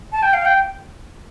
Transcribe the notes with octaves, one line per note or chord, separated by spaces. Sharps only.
A5
G5
F5
G5